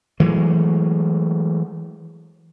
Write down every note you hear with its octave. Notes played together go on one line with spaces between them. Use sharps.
E3 F#3 G#3 A3